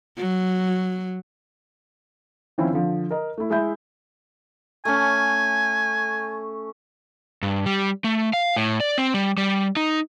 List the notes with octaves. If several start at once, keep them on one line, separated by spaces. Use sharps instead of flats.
F#3
D#3 F3 C4 C#4 E4
D3 F3
A#4 D#5 A#5
A3 E4
G#3 E4 E5 B5 G6
A3 C#4 G#5
G2
G3
A3
F5
A2
D5
C4
G3
G3
D#4